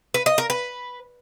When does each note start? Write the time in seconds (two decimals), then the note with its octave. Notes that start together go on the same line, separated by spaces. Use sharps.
0.14 B4
0.26 D#5
0.38 A#4
0.50 B4